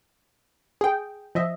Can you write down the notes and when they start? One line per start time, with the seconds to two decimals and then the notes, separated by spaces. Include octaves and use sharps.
0.81 G#4 G5
1.35 F3 D#5 E5